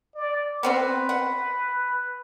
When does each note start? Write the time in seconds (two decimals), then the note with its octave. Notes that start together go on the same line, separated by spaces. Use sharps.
0.15 D5
0.63 B3 C4 F#4 B4
1.09 F#5